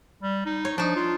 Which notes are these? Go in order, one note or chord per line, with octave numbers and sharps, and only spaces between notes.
G3
D#4
C#5
F3 D4 D#4
F4